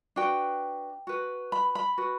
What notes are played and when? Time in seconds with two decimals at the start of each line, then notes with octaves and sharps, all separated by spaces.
0.16 D4 F#4 B4 G5
1.07 F#4 B4
1.52 B5
1.75 B5
1.98 F#4 B4